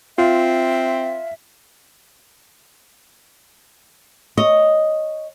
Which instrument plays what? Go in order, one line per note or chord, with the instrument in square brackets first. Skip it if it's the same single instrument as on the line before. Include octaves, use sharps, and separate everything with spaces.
[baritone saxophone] C4 [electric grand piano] F4 [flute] E5
[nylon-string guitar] C#5 D#5